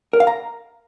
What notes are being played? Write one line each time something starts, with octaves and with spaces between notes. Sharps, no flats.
A#4
F5
A#5